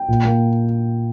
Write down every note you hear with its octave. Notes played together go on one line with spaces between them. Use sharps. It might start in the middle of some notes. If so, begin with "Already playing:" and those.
Already playing: G5
A#2
A#3